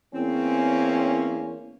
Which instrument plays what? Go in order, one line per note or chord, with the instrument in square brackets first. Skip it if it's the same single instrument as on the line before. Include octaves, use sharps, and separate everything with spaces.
[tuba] E2 [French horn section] E3 A#3 C#4 [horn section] C4